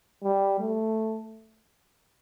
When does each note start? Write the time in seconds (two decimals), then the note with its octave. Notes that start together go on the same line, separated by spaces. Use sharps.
0.24 G3
0.60 A3